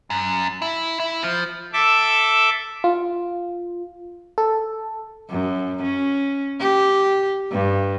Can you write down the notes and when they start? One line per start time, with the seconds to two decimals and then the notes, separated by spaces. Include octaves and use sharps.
0.10 F#2
0.62 E4
1.00 E4
1.23 F3
1.73 A4 E5 D6
2.84 F4
4.38 A4
5.30 F#2
5.82 C#4
6.60 G4
7.51 G2